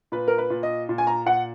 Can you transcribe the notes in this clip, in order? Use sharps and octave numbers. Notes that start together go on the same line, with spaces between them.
A#2 B4
A#4
B4
A#2
D#5
A#2
G#5
A#5
A#2 F#5